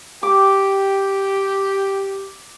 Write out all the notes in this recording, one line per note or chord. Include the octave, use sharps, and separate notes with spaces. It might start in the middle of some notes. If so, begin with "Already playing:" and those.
G4 D6